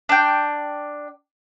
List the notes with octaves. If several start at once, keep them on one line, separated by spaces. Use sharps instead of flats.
D4 G5